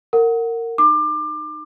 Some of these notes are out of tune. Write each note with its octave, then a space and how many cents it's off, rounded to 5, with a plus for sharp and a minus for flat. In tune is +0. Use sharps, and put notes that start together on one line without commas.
A#4 -20 F#5 -5
D#4 -20 D6 +25